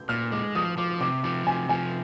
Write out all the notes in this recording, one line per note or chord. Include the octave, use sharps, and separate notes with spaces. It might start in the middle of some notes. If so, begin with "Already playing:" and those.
Already playing: G6
A#2 F6
G#3 D6
F3 D#6
F3 D6
C3 D6
F3 D6
C3 G#5
F3 G#5